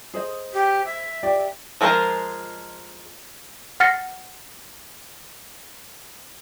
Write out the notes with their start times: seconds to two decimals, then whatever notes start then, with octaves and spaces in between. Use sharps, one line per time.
0.14 G#4 C5 D#5
0.53 G4
0.85 E5
1.23 G4 D5
1.81 F3 G#3 F4 A#4 C5
3.80 F#5 F6 A6 A#6 C#7